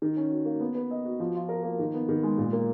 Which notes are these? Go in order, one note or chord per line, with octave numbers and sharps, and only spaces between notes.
D#3
C#4
F#4
A#3
B3
B4
D#5
F#4
F3
F4
A#4
A#3
D#3
B3
D#3
G#3
A#2
A#3